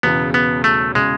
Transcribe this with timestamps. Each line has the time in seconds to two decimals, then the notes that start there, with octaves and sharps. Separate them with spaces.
0.03 E1 E2 C#3 B3
0.34 B3
0.64 A3
0.95 C#3 G#3